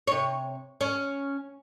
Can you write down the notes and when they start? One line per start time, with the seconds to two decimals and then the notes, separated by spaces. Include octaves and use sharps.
0.07 C3 C#5
0.81 C#4